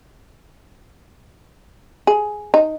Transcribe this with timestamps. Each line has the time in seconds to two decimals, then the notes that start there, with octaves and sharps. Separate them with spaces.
2.07 G#4
2.54 D#4